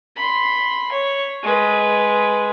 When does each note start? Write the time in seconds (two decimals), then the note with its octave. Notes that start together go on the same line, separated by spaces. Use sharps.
0.16 B5 C6
0.92 C#5
1.43 G#3 B4